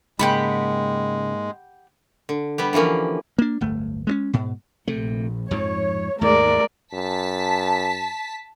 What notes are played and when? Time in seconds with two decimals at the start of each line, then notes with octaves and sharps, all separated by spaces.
0.19 G#2 C#3 G#3 A#3 G4 F#5 B5
2.29 D3
2.58 G3 B3 G4
2.73 D3 E3 F3 A#3 C#4
3.38 A#3 D4
3.61 D1 G1 A3
4.07 G#3 A#3 C#4
4.33 G#2 B2
4.88 A#1 C3 A3
5.51 F2 G#2 F3 C#5
6.21 D#2 G#2 G#3 A3 A#4 D5
6.94 F#2 A5 B6